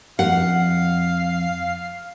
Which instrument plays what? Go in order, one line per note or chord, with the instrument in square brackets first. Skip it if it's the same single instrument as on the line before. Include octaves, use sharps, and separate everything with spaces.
[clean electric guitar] F2 [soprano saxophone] F5 [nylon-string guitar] F#5